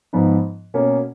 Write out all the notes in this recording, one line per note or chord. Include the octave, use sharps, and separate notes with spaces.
G#2 F3 B3 D#4
B2 A#3 C#4